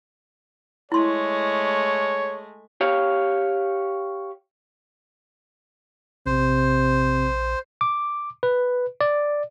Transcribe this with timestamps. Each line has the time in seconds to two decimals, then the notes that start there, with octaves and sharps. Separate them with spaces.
0.92 G#3 A3 E4 C#5 C6
2.81 G4 C#5 F5
6.26 A#1 C3 C5
7.81 D6
8.43 B4
9.01 D5